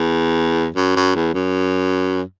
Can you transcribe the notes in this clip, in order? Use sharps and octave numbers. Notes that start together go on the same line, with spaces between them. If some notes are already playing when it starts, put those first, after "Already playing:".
Already playing: E2
F#2
F#2
E2
F#2